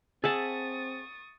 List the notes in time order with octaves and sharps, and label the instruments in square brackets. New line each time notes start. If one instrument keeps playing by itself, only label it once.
[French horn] C4 [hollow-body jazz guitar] G#4 [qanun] E5 F#5 A5 [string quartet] C#6 D#6 A6